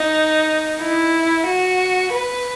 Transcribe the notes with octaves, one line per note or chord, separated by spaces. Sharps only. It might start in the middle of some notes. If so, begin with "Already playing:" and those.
Already playing: D#4
E4
F#4
B4